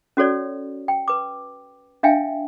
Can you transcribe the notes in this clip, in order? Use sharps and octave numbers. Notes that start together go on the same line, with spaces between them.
C#4 F#4 A4 C#5 D5
G5
B4 D6
D4 E5 F5 G5 G#5